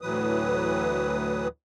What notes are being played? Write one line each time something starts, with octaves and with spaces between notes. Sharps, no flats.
D2 A2 E3 F#3 B4 D#6